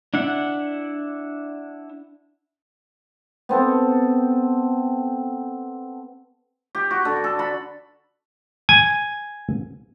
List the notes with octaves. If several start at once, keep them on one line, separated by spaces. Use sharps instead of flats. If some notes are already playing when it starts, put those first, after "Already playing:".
D4 E4 F#5
B3 C4 A4
G4
F#4
D3
A4
B5
G#5